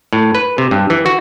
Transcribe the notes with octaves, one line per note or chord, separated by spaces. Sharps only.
A2
B4
C3
G2
E3
F#4